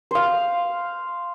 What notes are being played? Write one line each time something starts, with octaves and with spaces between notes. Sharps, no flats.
C5 F5